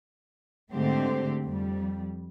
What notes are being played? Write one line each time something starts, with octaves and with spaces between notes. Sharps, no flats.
G#2 D3 A3 C4 G4 C5
F2 G3